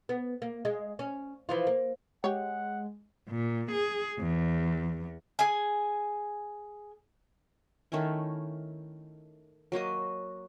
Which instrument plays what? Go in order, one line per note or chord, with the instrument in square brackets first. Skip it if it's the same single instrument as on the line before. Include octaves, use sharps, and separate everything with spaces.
[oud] B3
A#3
G#3
C#4
E3 F3 F4
A#3
[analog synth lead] G#3 [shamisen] G4 C#5 [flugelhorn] F#5
[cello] A#2
G#4
E2
[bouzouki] G#4 G#5
[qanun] D#3 A3 C#4 E4
F#3 A#3 F#4 D#5